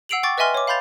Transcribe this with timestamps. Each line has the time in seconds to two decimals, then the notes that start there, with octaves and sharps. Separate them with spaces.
0.09 F#5 E6 C7 D7 F7 F#7
0.23 G5 C#6 D6 A6
0.38 B4 D#5 E5 G#5 C6 F6
0.54 C#5 D6
0.67 F5 B5 C6 G6 A6 F7